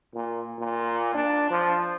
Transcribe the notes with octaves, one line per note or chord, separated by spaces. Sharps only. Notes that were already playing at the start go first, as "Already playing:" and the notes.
A#2
A#2
D4
F3